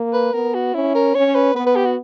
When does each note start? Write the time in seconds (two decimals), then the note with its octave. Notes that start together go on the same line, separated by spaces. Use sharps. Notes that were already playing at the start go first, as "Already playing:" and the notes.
Already playing: A#3
0.13 B4
0.34 B3 A#4
0.54 F#4
0.75 C#4 E4
0.95 A#4
1.15 C#4 C#5
1.35 B4
1.55 B3 B4
1.66 B4
1.76 G4
1.85 F#4